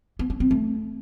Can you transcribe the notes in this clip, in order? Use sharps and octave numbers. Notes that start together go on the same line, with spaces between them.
B3
C#4
C4
A3